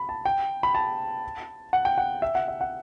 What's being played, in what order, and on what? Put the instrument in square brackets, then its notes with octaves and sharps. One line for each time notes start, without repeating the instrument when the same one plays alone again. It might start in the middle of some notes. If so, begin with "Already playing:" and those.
Already playing: [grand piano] B5
A5
G5
B5
A5
F#5
G5
F#5
E5
F#5
E5
F#5